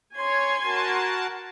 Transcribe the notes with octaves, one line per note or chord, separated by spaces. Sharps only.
C#5 G#5 C6 G#6
F#4 A#4 A5